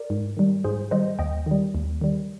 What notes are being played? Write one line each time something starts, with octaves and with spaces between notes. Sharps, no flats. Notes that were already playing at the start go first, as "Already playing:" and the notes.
Already playing: A#4 D5
G#2
D#3 G3
G#2 G#4 C5
D#3 G3 C5 D#5
D#2 D#5 G5
D#3 G3
D#2
D#3 G3